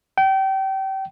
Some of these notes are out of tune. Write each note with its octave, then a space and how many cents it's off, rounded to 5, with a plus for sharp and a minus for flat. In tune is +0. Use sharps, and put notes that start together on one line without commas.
G5 -30